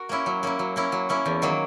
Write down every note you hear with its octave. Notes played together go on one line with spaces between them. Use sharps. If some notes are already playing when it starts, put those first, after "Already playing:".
Already playing: F#4 A#4
A#3 C#4 E4
F#3
A#3 C#4 E4
F#3
A#3 C#4 E4
F#3
A#3 C#4 E4
E2
D#3 F#3 A#3